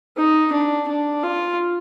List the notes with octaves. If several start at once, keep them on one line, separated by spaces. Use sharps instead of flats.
D#4
D4
D4
F4